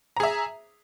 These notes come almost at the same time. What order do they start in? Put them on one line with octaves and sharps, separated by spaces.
A#5 G#4 E5